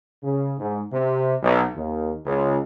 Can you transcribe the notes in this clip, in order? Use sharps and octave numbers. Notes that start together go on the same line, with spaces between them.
C#3
G#2
C3
B1
D#2
C#2